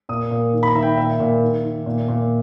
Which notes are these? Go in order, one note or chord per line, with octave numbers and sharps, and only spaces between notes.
A#2 D#6
A#2
D#3
B5
A#5
D#3 E5
G5
A#2 E5
A#2
D#3
D#3
A#2
A#2